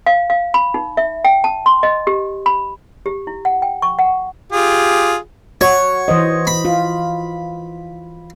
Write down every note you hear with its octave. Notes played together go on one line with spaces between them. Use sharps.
F5
F5
B5
D#4
E5
G5
A5
C6
D#5
G4
B5
G4
E4
F#5
G5
C#6
F#5
F4 G4 G#4
F#4 C#5
E3 C5 D#5
B5
F4